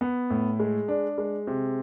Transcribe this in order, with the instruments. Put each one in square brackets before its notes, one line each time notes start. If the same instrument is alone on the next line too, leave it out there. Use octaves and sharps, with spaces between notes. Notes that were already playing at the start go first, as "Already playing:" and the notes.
[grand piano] B3
A2
G#3
D4
G#3
C3